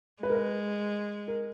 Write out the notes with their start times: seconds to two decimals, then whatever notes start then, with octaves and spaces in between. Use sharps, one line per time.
0.23 G#3 B4
0.30 A#4
0.35 B4
1.28 A#4